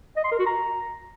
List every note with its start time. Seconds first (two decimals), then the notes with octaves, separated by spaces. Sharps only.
0.17 D#5
0.24 C6
0.31 A#4
0.39 F#4
0.46 A#5